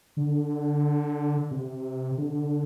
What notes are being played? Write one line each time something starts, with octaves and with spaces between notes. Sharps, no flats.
D3
C3
D3